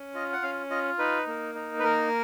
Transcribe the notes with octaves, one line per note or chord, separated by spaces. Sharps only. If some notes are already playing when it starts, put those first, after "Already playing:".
Already playing: C#4
F4 D#5
F#5
C#4 F5
F4 D#5
D#4 B4
A#3
D#4
B4
A#3 A#4